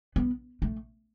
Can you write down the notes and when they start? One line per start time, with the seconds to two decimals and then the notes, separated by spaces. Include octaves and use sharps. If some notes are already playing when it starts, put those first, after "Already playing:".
0.16 B3
0.62 A3